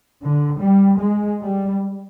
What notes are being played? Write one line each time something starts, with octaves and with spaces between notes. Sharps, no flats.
D3
G3
G#3
G3